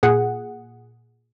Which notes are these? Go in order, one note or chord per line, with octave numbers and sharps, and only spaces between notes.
A#2 G#4 F#5